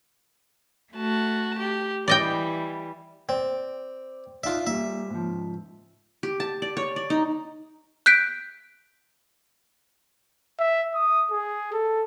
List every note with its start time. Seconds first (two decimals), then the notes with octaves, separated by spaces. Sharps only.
0.93 A3 F#4 A5
1.57 G4
2.08 E3 G3 D5 D#5 G5
3.29 C4 D5
4.44 D#4 F4 D5 E5
4.67 G3 A#3 E5
5.10 G#2 F3
6.23 G4
6.40 A5
6.62 D5
6.77 C#5
6.96 D5
7.10 D#4
8.06 F#6 G6 B6 D7
10.59 E5
10.95 D#6
11.31 G#4
11.73 A4